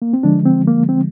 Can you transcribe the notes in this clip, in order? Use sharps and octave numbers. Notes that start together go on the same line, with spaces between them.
A#3
C4
D3 F3 G#3 D4
C4
A#3
C4